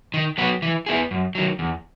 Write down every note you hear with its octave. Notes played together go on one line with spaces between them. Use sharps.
D#3
F#3 B3 F#4
E3
B3 E4 G#4
F#2
D#3 F#3
E2